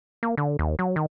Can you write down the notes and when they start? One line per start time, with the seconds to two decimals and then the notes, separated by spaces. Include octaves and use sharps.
0.23 A#3
0.38 D3
0.59 D#2
0.79 F#3
0.96 D#3